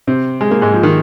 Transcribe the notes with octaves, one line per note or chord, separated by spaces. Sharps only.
C3 C4
G#3
A#3
G#2 G#3
F3
D#3